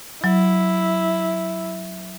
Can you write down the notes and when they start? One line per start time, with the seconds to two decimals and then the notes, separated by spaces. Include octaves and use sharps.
0.24 F#3 E4